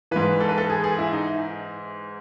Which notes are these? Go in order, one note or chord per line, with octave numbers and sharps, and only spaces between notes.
G#2 E3 B4
A4
B4
A4
G#4
G#4
E4
D#4